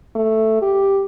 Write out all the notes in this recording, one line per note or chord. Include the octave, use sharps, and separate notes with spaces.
A3
G4